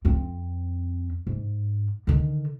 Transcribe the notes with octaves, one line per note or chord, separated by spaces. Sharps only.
F2 C4
G#2
D3 D#3